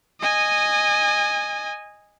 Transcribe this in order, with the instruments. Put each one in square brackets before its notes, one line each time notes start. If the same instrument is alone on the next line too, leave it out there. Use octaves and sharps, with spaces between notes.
[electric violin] D#5 G#5